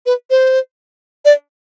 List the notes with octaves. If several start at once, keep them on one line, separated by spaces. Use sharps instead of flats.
B4
C5
D5